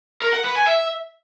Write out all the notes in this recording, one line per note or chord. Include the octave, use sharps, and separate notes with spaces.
A#4
F#5
B4
G#5
E5